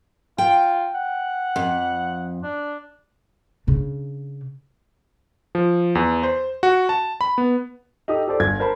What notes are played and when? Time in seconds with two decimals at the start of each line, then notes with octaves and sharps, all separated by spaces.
0.38 F4 G5
0.95 F#5
1.56 F2
2.43 D4
3.67 C#3 D4
5.55 F3
5.95 E2
6.23 C5
6.63 F#4
6.89 A5
7.21 B5
7.38 B3
8.08 D#4 G4 A4 D#6
8.27 G4 A4 C5 D5
8.40 G1 G#6 A6
8.59 A#4 C5 A5 B5